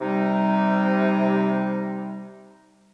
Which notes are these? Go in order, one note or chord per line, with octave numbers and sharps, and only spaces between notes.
C3 G3 D#4